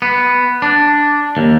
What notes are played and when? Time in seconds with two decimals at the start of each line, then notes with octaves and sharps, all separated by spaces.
0.02 B3
0.62 D4
1.37 D#2